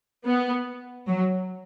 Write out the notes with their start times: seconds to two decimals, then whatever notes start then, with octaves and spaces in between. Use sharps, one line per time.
0.26 B3
1.07 F#3